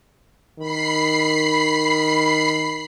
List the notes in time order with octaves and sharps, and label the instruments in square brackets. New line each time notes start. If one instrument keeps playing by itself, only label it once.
[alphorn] D#3 [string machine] B5 C7